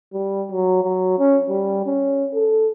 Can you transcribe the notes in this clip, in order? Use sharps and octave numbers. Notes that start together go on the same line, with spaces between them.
G3
F#3
F#3
C#4
G3
C#4
A4